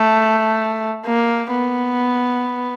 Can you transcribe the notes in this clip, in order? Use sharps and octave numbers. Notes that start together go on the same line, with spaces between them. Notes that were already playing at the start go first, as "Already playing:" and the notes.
Already playing: A3
A#3
B3